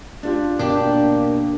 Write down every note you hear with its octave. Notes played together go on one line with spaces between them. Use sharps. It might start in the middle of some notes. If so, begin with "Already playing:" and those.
D4 F4 G4
B2 A#3 D4 G4